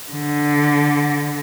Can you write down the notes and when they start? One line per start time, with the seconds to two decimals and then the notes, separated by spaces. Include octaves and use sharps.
0.11 D3